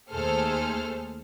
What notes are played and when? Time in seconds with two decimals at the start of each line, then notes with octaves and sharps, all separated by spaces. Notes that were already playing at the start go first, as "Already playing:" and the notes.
0.11 D#2 A3 G#4 A4 C5 F6